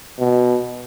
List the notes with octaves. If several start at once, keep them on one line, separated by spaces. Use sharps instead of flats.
B2